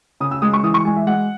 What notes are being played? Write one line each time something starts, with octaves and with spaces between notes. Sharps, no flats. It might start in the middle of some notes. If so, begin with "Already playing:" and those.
C#3 D#6
E6
G#3 D#6
C#6
E3 D#6
C#6
G#3 G#5
E5
G#3 F#5